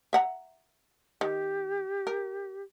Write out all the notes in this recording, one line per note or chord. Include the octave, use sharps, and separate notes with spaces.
E5 F#5 A#5
D#3 G4
A#4